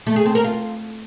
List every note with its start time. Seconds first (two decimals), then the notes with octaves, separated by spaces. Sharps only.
0.07 A3
0.16 G#4
0.25 C4
0.35 A#4
0.44 F4